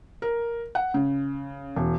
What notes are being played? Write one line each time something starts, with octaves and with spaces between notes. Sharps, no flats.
A#4
F#5
C#3
E1